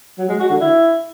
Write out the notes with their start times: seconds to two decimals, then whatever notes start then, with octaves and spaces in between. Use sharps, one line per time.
0.18 F#3
0.29 G#3
0.40 F#4
0.50 D3
0.61 E4